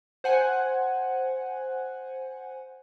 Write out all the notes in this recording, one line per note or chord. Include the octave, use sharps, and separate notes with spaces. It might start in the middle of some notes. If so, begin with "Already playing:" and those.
C5 F#5 G#5